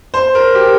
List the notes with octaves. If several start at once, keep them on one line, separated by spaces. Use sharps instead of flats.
C5
A#4
G4